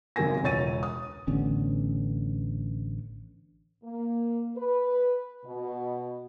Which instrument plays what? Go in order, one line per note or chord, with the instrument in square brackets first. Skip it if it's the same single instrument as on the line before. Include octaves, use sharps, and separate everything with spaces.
[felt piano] G#1 F#2 C#3 A#4 G#5 A#6
E1 C#2 C#5 A6 D#7
D#6
[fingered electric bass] A1 D3 B3 C#4
[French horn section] A#3
B4
B2